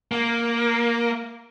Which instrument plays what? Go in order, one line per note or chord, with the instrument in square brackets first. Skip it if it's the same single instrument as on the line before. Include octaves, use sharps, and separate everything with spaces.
[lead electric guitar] A#3